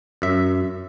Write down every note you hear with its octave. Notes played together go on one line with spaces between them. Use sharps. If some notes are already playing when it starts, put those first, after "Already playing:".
F#2 E5